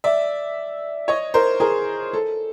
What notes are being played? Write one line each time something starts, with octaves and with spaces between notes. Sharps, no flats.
D5 E5
C#5 D#5
A#4 C5
G#4 A#4
A4